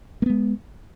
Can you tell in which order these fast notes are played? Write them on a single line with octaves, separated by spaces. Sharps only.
A#3 B3 G#3